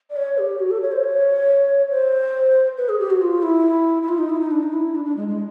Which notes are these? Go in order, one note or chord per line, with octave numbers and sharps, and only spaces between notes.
D5
C#5
G4
F#4
A4
C#5
C5
C#5
C5
B4
G#4
G4
F#4
F4
E4
E4
F4
D#4
E4
D#4
D4
D#4
E4
D4
D4
G#3
G#3